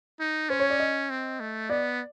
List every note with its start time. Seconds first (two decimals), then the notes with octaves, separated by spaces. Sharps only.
0.20 D#4
0.50 C#4 C5
0.60 C#5
0.70 D5
0.80 D#5
1.10 C4
1.40 A3
1.70 B3 D5